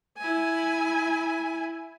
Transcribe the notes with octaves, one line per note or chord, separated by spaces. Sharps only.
E4 G#5